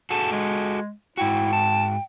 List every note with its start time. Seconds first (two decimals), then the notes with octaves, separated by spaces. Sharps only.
0.10 F#4 G#4 A4 A5
0.32 G#3
1.17 G#2 E4 F#4 G5
1.52 A5